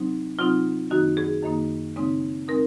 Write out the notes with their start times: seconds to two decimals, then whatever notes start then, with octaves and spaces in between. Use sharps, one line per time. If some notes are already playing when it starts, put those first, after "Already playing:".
Already playing: C3 F#3 C4 D#4
0.38 C3 F#3 C4 D#4 F4
0.90 F#2 D#3 A#3 D#4 F#4
1.17 G#4
1.43 F#2 D#3 A#3 D#4
1.96 C#3 G#3 C4 D#4
2.48 G#3 C4 D#4 A#4